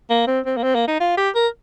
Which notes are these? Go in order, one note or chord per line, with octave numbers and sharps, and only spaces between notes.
A#3
C4
C4
A#3
C4
A#3
D#4
F4
G4
A#4